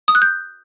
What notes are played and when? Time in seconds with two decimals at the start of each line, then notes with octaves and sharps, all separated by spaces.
0.08 D#6
0.15 F#6
0.22 G6